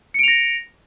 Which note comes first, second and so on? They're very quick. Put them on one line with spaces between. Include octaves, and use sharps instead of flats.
C#7 D7 F7 A#6